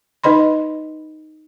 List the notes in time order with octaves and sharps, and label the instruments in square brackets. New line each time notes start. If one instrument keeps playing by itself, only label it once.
[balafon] D#4 B4 D#5 B5 C6